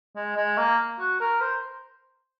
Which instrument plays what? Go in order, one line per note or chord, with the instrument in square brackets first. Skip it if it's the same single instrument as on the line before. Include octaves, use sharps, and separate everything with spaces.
[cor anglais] G#3
G#3
A#3
F#4
A#4
C5